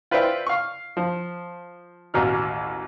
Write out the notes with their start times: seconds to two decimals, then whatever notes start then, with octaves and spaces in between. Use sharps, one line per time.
0.11 F4 B4 C5 D5 E5 G5
0.47 F5 C#6
0.97 F3
2.14 A1 D#2 B2 F6